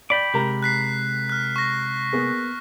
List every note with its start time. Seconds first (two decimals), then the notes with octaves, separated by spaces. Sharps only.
0.10 D5 G5 B5 D6
0.34 C3 G#3 G4 A#4 A#5
0.63 F#6 B6 C7
1.30 F6 F#6
1.56 C#6 A#6
2.13 A#3 B3 G#4